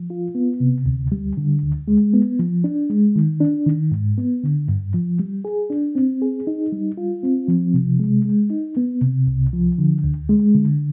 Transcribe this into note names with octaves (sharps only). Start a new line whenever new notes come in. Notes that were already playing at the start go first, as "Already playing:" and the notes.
Already playing: F3
F4
B3
C3
D2
G3
D3
D2
G#3
B3
F3
D4
G#3
D#3
D4
D#3
G#2
B3
D3
G2
F3
G3
G#4
D4
C4
G#4
D#4
G3
F4
C4
F3
C3
G#3
G#3
D#4
B3
C3
C2
F3
D3
D2
G#3
D3